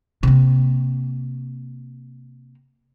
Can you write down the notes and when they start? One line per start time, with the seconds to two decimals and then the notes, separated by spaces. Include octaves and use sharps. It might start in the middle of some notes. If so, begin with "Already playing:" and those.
0.23 C3 A#3